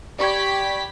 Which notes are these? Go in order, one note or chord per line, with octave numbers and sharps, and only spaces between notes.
G4 D5 B5 C#6 G#6 B6